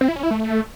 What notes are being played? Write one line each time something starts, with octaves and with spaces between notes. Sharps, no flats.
C4
E4
C#4
E4
A3